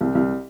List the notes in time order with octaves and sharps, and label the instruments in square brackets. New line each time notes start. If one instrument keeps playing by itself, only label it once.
[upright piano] C2
C2